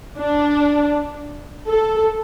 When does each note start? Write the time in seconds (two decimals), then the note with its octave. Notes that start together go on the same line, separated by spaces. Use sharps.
0.18 D4
1.67 A4